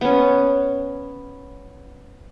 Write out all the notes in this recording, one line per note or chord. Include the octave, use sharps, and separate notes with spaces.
B3 C#4